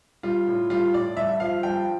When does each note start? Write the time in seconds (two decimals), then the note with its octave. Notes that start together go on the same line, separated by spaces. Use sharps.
0.23 G3 F4
0.47 A2
0.70 G3 F4
0.94 A2 D5
1.17 G2 E5
1.40 F3 F5
1.63 G2 G5